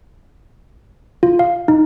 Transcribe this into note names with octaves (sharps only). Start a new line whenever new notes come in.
F4
F5
D#4